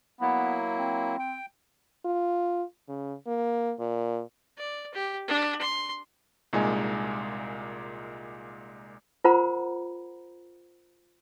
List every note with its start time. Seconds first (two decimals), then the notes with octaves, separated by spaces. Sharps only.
0.21 F#3 A#3 B3 E4
0.78 C4
1.19 G5
2.05 F4
2.89 C#3
3.27 A#3
3.79 A#2
4.57 D5
4.94 G4
5.28 D4
5.61 C6
6.53 C2 A#2 G#3 D#4 G#5
9.24 F4 A#4 C5 F#5 A#5 B5